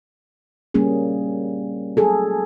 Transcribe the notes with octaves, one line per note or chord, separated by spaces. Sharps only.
G3 A#3 C#4 G#4
F#3 G#4 A4